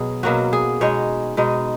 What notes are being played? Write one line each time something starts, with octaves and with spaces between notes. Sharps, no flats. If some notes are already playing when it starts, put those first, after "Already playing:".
Already playing: B2 F#3 G#4
B2 F#3 A#3 C#4 F#4
G#4
B2 G#3 D#4 C#5
B2 G#3 D#4